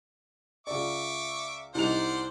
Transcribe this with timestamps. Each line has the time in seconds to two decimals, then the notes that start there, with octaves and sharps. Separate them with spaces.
0.67 C#2 D5 E5 C#6 D6
1.75 C2 D#4 C5 D5 F#5 F7